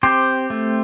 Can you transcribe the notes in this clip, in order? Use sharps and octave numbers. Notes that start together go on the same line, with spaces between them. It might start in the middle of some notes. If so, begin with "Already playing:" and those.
C4 G4 C5
A3